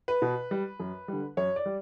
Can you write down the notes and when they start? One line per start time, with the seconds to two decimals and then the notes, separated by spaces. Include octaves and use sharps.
0.08 B4
0.22 B2
0.51 G3
0.80 F#2
1.08 D3 G3
1.37 F#2 C#5
1.56 D5
1.66 G3